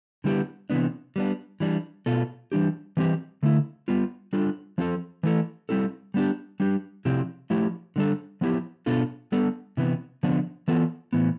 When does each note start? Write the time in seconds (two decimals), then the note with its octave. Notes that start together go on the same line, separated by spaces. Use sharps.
0.24 D3 G3 B3 E4 G4
0.70 C3 E3 G3 B3 D4
1.16 G3 B3 D4
1.60 E3 G3 D4
2.06 B2 B3 F4 A4
2.52 E3 G3 D4 G4
2.97 E3 G3 C4 G4
3.43 D3 A3 E4
3.88 G3 B3 F4
4.33 G3 D4 F4 A4
4.78 F3 C4 F4 A4
5.23 E3 A3 E4 A4
5.69 G3 C4 E4 A4
6.14 G3 B3 D4 G4
6.60 G3 D4 G4
7.05 C3 F3 C4 E4 G4
7.50 F3 A3 E4 G4
7.96 D3 G3 D4 A4
8.41 F3 B3 E4 G4
8.86 B2 B3 D4 F4 A4
9.32 G3 B3 D4 A4
9.77 C3 E3 B3
10.23 D3 F3 B3 D4
10.68 E3 B3 F4 A4
11.13 A2 E3 B3